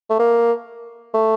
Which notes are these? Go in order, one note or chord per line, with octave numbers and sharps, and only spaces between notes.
A3
A#3
A3